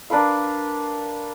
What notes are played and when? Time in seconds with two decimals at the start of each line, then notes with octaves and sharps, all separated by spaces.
0.10 D4 A#4 B4 F5